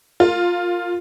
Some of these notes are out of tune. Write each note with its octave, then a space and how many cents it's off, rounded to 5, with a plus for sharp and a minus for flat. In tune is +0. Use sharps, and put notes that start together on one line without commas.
F4 +5 A#4 -25